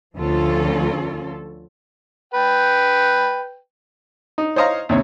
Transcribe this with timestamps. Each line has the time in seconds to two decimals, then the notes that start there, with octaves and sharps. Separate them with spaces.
0.17 D2 D3 F3 C#4 F4 A4
2.34 B4 G5
4.38 D#4
4.56 C5 C#5 D#5 F5 A#5
4.89 D#2 C3 C#5